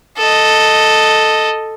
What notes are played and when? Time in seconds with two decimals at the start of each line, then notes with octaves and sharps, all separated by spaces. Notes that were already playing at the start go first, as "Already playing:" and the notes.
0.17 A4 D#5